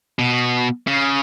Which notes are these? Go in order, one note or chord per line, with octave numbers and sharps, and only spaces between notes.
B2
C#3